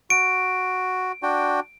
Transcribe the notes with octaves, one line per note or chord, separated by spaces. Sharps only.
F#4 D7
D4 F#4 G5